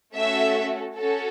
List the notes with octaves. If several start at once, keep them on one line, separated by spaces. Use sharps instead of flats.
A3 C#4 F#4 A4 E5
C#4 F#4 A4